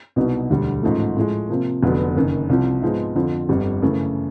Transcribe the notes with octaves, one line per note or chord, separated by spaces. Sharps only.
C2 B2 F#3 B3 D#4
E1 D2 D3 G3
A1 G#2 F3 A3
A2 F3 G#3
C3 F3 A#3
F1 F2 D3 F#3 B3
F#1 F#2 D#3
C2 C3 F3
G#2 F3 G#3 B3 D#4
F2 D3 F3
G1 F2 D3 G3
F#2 C#3 E3 A3